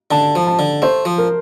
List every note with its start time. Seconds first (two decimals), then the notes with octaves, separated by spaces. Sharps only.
0.11 D3 A5
0.35 F3
0.47 A5
0.59 D3
0.82 A3 C5
1.05 F3
1.18 A#4